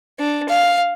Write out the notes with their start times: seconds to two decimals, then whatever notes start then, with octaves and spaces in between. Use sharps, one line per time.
0.19 D4
0.49 F5